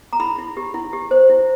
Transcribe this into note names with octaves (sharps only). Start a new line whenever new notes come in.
A#5
E4 B5
E4
G4
E4
G4
C5
E4